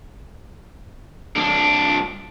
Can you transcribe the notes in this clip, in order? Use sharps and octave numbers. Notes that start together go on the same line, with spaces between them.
C2 D4